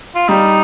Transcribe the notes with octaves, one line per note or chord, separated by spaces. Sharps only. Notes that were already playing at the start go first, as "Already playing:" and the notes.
F4
G3 D#4